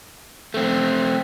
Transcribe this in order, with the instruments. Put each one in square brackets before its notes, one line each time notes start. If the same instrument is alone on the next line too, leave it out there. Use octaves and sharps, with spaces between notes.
[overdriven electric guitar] A3 C4